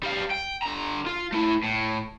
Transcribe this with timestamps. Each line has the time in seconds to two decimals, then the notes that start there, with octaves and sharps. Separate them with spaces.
0.03 G3 F5
0.30 G5
0.62 D3 A#5
1.06 F4
1.33 A3 E4
1.64 A2